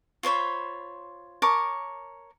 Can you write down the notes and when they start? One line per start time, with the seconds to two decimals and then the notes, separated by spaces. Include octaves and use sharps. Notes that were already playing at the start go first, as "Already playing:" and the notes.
0.23 F4 C5 C#5 B5
1.42 A#4 C#5 A5 D6